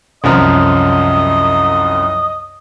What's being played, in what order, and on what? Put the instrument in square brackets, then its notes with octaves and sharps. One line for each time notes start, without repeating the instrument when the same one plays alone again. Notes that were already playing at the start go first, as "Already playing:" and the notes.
[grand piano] C2 F#2 F3 [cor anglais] D#5